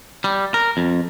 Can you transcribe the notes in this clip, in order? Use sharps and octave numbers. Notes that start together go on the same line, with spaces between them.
G3
A#4
F2